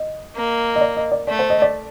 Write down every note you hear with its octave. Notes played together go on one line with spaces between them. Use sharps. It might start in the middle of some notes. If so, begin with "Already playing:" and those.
Already playing: D#5
A#3
D#5
D5
D#5
D5
A3 D5
C5
D#5
D5